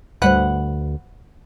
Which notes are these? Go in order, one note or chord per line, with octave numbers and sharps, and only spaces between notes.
D2 G#2 G3 B4 C5 F#5